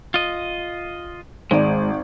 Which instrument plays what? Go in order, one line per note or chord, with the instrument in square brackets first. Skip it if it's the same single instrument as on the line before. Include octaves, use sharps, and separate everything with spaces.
[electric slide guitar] F4 D#5
[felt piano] G#1 D5 [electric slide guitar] G#3